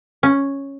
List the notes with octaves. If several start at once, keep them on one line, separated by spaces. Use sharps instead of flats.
C#4